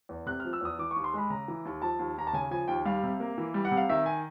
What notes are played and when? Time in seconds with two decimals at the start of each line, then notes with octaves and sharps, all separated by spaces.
0.09 E2
0.26 C3 F#6
0.40 F6
0.45 F3
0.53 E6
0.61 E2 D#6
0.79 E3 D6
0.91 C#6
0.96 D#2
1.04 C6
1.14 G#3 B5
1.30 C#3 A#5
1.48 E3
1.65 D#2
1.82 F3 A5
1.99 D#2
2.17 D#2 A#5
2.27 A5
2.33 C#3 G#5
2.51 F3 G#5
2.68 D#2 G5
2.85 G3 F5
3.03 C3
3.20 A#3
3.38 E3
3.54 G3
3.65 F#5
3.71 C3
3.77 F5
3.89 D#3 E5
4.06 G#5